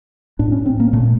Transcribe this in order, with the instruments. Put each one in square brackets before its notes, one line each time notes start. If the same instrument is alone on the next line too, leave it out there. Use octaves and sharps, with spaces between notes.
[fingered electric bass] A2 D4
C#4
C4
A#3
A#2 A3